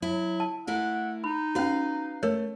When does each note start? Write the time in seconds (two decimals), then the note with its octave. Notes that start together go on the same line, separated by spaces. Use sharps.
0.02 F#3 E4
0.40 A5
0.67 A3 E4 A#4 F#5
1.24 D#4 B5
1.55 C#4 F#4 B4 F5
2.23 A3 A#4 C#5